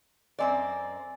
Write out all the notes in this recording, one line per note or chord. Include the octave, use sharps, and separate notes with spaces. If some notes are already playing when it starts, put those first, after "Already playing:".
F#2 C4 D5 D#5 G#5